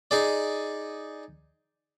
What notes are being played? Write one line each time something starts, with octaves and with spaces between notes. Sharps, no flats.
D#4 G#4 D5